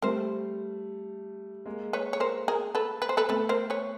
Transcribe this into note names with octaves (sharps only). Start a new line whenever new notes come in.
G3 A3 A#4 C5
G#3 A#3
B4 C#5
C#5
A#4 C5
G#4 A#4
A4 B4
B4
C5
A4 B4
A3 B3 A4 B4
A#4 C5
B4 C#5